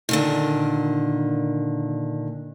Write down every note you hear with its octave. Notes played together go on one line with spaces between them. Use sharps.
A#2 D3 D#3